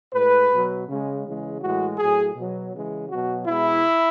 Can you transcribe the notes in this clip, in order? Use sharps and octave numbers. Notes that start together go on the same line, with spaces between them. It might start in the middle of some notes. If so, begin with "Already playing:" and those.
A2 G#3 B4
B2 F#3
C#3 G#3
C#3 E3 G#3
A2 E3 G#3 F#4
A2 F#3 G#4
B2 F#3
C#3 E3 G#3
B2 F#3 F#4
B2 G#3 E4